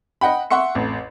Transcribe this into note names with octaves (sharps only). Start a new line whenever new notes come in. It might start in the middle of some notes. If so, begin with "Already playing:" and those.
D#5 F#5 G5 B5
E5 F#5 C6 C#6 C#7
A1 F2